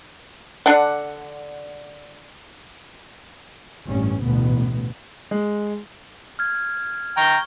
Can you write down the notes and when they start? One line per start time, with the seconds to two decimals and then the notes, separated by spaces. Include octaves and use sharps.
0.66 D3 D4 F#5
3.88 A1 G2 C#4
4.22 A1 D2 B2 B3
5.31 G#3
6.39 F6 G#6
7.17 G5 A#5 C#6 G7